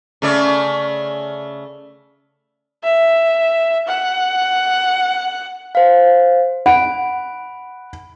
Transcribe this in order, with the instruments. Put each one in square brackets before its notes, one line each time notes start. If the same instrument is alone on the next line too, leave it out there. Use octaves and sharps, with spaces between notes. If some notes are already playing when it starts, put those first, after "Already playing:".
[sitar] C#3 A3 D5
[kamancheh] E5
F#5
[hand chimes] C5 F5
[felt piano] F#5 [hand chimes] B5 D7